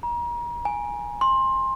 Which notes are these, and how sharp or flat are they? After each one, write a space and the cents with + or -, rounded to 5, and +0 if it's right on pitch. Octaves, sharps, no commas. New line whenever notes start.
A#5 +35
G#5 -5
C6 +20